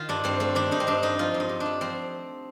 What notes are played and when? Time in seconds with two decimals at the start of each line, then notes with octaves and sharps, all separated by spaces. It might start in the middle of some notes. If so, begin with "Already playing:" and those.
Already playing: D#3 F4
0.09 G2 D4
0.24 G2 C4
0.40 A3 C4
0.55 D#3 D4
0.71 G2 D#4
0.80 C4
0.87 G2 D4
1.02 A3 D#4
1.19 F3 F4
1.34 G2
1.40 D#4
1.49 G2
1.60 D4
1.66 A3
1.81 F3 C4